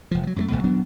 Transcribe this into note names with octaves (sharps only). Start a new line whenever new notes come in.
F1 F3
F3 F#3
F#2 F#3 A3
G1 C#2 B2 A3
D#1 F#3 B3 D4